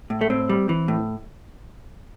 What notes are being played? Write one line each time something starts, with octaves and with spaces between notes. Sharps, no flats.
A2
A3
A2 C4
G3
E3
A2